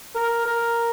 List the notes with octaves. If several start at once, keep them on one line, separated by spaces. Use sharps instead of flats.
A#4
A#4